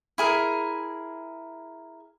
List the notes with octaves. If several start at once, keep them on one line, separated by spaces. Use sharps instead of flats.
E4 G#4 A#4